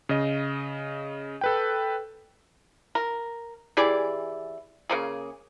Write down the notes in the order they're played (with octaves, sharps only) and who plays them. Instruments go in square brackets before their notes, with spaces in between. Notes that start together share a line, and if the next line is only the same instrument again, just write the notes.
[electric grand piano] C#3 D#5
A4 B4 G5
[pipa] A#4
E3 G4 G#4 D5
C#3 A#3 G#4